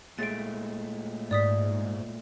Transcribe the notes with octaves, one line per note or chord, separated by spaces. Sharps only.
A#2 G#3 A3 A6 D7
G#2 D5 D#6 B6